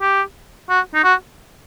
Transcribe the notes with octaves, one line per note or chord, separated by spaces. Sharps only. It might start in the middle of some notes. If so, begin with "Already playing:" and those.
G4
F#4
D#4
F#4